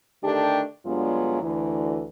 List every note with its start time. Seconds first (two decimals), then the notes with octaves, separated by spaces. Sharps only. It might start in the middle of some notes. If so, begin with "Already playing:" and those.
0.22 D3 D#3 A3 D4 G4
0.85 G2 D3 F#3 G#3 B3 F4
1.42 D2 E3